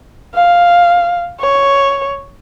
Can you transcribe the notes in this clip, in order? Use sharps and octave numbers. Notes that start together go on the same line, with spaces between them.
F5
C#5